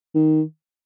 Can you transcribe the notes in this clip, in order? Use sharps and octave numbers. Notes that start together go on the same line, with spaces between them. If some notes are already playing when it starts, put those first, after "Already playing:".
D#3